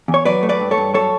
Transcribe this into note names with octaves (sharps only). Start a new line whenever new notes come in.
E2
C#5
F#3 B4 D5
A3
B4 D5
G2
A4 C#5
G2
F#3 A4 C#5